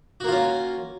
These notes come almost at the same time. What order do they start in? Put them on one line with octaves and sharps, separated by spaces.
F#4 A#3 F4 C#4